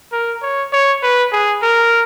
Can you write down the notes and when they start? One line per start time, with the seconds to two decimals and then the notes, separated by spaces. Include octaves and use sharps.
0.12 A#4
0.42 C#5
0.72 C#5
1.03 B4
1.32 G#4
1.62 A#4